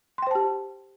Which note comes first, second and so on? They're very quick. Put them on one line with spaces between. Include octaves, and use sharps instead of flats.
C6 G5 C5 A5 G4